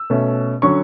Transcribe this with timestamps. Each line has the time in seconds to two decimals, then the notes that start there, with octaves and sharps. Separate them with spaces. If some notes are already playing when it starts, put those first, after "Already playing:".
Already playing: E6
0.10 B2 A3 C#4
0.62 D3 F#3 C#4 C#6